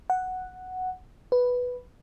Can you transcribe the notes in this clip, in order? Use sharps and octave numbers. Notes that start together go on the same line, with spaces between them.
F#5
B4